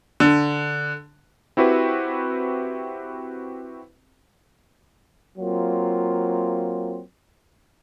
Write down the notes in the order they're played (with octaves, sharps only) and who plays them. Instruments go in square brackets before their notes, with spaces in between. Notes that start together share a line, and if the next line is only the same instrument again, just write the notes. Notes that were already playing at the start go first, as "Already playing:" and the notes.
[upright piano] D3
[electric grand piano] C4 E4 F#4 G4 B4
[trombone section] F#3 A#3 C4 F4